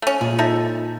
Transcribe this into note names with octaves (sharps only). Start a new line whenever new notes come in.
A3 C#4
A#2 F3 G#3 F4 G#4
D#4 A4 E5